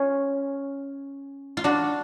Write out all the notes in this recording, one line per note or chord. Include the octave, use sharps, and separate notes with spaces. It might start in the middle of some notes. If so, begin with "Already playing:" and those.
Already playing: C#4 F4
F4
D4 F#4